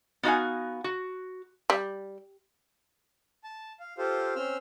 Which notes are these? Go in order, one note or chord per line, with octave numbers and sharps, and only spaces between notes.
B3 D#4 F#4 D#5 F5 G#5
F#4
G3
A5
F5
F4 G4 A4 C5 F5
C4 C#4 C6 E6 F6